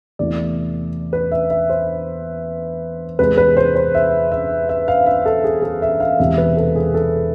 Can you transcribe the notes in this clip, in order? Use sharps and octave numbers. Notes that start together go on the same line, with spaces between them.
E2 C3 E3 A3 D5
B4
E5
E5
C5
E2 C3 G#3 B4
B4
C5
C5
E5
E5
E5
F5
E5
A4
G#4
A4
E5
F5
E1 E2 C3 G#3 C4 E5
B4
A4
G#4
A4